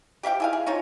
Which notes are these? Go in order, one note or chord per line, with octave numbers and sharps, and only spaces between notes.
G4 E5 F5 G5
E4 G#4 F5
G#4
C#4 D#4 F4 C#5